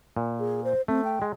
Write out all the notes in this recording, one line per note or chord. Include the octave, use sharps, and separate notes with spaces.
A#2
G#4
C5
A3 C4
G5
G#3